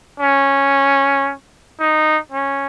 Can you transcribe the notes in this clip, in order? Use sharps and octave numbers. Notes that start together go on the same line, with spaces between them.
C#4
D#4
C#4